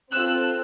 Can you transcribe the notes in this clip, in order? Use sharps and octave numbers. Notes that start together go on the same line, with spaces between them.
C4 F4 A4 E6 F#6